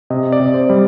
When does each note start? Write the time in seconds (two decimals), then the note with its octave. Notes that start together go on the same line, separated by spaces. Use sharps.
0.10 C3 D#5
0.32 D5
0.40 C3
0.54 C5
0.69 G3